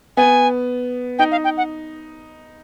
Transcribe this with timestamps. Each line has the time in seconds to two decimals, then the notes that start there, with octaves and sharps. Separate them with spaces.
0.17 B3 G#5
1.19 D#4 G5
1.32 F5
1.44 G5
1.57 F#5